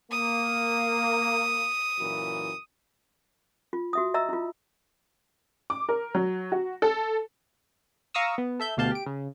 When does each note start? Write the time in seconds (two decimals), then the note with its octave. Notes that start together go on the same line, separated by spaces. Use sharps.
0.11 A#3 D#6
1.98 F#2 A#2 E3
3.73 F4
3.93 F#4 E5 D#6
4.14 D#5 E5 A#5 E6
4.29 E4 F4
5.70 D6
5.89 A#4
6.15 F#3
6.52 F#4
6.82 A4
8.14 F5 A#5 C#6 D#6 E6
8.38 B3
8.60 A4 E5 G6
8.77 D2 B2 G4 F5 A5 G6
8.91 G4 D7
9.06 C#3